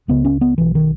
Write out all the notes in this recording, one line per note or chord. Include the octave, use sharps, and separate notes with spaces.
C#2 C#3 B3
C#4
B3
B1 B2 E3
D#3